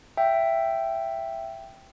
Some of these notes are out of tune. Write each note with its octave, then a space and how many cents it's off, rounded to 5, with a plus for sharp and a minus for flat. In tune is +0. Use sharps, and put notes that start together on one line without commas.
E5 +10 G5 +0